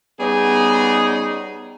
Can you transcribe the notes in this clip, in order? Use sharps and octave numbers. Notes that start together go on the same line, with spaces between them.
G3 B3 C#4 D#4 G#4